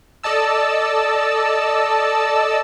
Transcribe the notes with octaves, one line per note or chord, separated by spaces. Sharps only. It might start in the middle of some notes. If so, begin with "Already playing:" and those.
A4 D5 D#5 A5 E6